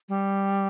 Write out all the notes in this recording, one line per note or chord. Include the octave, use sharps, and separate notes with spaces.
G3